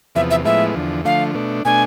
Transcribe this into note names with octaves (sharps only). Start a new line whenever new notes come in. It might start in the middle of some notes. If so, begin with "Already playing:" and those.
E2 C3 F3 B3 E5
E5
A2 F3 G#3 B3 E4 E5
E2 D3 F3
D3 F3 A3 F5
B2 A3 D4
B2 A3 D4 G#5